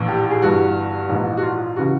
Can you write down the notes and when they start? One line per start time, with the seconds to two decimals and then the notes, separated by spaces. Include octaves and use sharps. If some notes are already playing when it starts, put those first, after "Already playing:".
Already playing: A#1 A2 E3
0.08 G4
0.20 G4
0.30 G#4
0.41 G1 G2 E3 F#4
1.09 A#1 G#2 E3
1.37 F#4
1.43 F4
1.76 C#3 E3 F#4